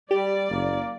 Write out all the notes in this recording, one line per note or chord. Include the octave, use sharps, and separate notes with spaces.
G3 G4 D5
F#1 A#3